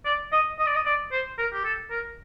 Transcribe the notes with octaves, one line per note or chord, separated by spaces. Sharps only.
D5
D#5
D#5
D5
D#5
D5
C5
A#4
G4
A4
A#4